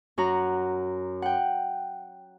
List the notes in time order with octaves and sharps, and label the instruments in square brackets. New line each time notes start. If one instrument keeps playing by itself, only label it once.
[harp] F#2 F#4 F#5 A#5
F#5 G5